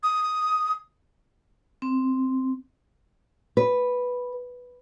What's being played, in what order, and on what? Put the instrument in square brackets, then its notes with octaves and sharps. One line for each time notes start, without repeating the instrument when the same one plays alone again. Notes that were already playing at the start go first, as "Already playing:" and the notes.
[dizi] D#6
[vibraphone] C4
[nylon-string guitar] B4